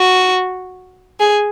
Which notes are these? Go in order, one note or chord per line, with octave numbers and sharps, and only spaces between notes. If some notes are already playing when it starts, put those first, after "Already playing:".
Already playing: F#4
G#4